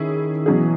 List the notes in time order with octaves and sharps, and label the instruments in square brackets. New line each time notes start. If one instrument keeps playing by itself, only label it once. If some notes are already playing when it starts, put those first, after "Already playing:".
Already playing: [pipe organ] D#3 [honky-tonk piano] C#4 E4 G#4
[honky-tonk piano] B2 F#3 C#4 G#4 [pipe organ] E3